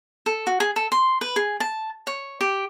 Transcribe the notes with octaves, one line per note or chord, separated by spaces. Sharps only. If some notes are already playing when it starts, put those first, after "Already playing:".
A4
F#4
G#4
A4
C6
B4
G#4
A5
C#5
G4